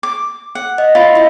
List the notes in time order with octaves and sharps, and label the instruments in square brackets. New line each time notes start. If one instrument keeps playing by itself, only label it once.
[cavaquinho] D6
F#5
[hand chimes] D#5
[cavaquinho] F4 [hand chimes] E5 B5
[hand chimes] E4 D#5 E5